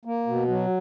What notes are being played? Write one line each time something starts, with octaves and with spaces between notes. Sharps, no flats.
A#3
B2
F#3